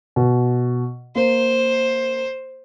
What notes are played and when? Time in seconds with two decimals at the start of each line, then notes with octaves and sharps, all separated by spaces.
0.16 B2
1.15 A#3 C5